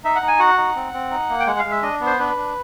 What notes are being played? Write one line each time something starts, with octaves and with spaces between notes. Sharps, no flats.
D#4 E5
F#5
D#4
G#5
F#4 F#5
D#4
C4
C4
D#4
A#3
G5
G#3 F#5
F5
G#3
E5
D4 D#5
B3
C5
D4 B4
D4